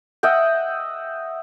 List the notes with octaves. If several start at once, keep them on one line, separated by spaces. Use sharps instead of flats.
D#5 E5 F#5 G5